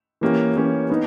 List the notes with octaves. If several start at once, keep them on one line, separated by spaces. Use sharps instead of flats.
E3 A#3 C#4 G4
E3 A#3 C#4 G4
B3 D#4